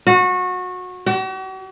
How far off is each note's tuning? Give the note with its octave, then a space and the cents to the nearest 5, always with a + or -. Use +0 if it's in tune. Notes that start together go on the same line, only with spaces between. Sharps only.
F#4 -25
F#4 +45